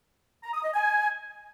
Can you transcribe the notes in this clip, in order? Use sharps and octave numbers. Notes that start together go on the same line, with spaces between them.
A#5
D#6
D#5
G#5